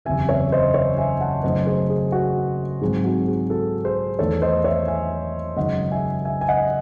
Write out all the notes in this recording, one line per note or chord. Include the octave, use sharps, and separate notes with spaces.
F#1 E2 C3 E5 G#5
C#5 E5
C5 D#5
C#5 E5
E5 G#5
F#5 A5
F#1 F#2 D#3 A3 C5 D#5
G#4 C5
G#4
F#4
G#2 D#3 F#3 C4 G#4
F#4
G#4
F#4 A4
G#4 C5
E2 D#3 A3 A4 C#5
C5 D#5
C#5 E5
E5 G#5
F#1 F#2 D#3 G#3 D#5 F#5
E5 G#5
E5 G#5
G#5
D#5 F#5